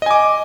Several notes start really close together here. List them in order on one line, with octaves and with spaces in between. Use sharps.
D#5 G#5 D6